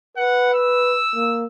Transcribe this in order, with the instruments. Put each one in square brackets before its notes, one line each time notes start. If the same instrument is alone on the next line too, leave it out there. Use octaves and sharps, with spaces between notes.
[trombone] B4 [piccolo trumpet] F#5
[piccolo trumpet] E6
[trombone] A#3